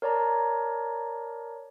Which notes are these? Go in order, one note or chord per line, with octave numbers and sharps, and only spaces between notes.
A#4 C#5 D5 A5 A#5